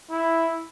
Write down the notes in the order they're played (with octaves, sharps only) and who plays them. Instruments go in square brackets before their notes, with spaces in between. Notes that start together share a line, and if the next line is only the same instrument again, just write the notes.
[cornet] E4